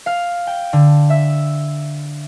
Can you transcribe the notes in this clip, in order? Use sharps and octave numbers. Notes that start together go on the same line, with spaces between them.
F5
G5
D3
E5